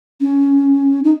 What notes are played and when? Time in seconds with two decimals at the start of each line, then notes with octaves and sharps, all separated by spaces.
0.21 C#4
1.04 D#4